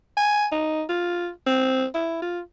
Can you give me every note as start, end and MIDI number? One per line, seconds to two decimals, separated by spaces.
0.17 0.47 80
0.52 0.83 63
0.89 1.29 65
1.46 1.86 60
1.94 2.18 64
2.22 2.41 65